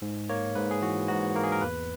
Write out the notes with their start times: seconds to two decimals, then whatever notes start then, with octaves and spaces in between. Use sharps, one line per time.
0.02 G#2
0.29 A#3 C#5
0.55 G#2 B4
0.71 G#4
0.82 E3 F#4
1.08 G#2 F#4
1.35 A#3 A#4
1.44 G#4
1.52 A#4
1.62 E2 B4